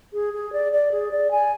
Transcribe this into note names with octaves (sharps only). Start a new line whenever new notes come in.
G#4
G#4
D5
D5
G#4
D5
G#5